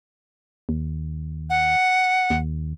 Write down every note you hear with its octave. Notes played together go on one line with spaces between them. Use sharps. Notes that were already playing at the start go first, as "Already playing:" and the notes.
D#2
F#5
D#2